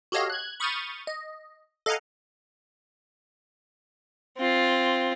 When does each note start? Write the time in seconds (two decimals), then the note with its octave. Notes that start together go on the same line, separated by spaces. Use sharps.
0.12 F#4 G4 A4 C#5 D#5 F5
0.30 F#6 G#6
0.60 B5 C#6 D#6 F6 G6 A6
1.07 D#5
1.86 A4 D#5 F5 F#5 G#5 A#5
4.38 C4 F4